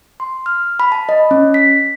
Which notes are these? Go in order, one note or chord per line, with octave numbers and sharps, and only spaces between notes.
C6
F6
B5
A5
D#5
C#4
B6